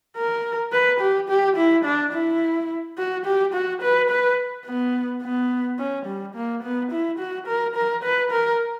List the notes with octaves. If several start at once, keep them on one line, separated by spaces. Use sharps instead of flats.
A#4
B4
G4
G4
E4
D4
E4
F#4
G4
F#4
B4
B4
B3
B3
C#4
G3
A#3
B3
E4
F#4
A#4
A#4
B4
A#4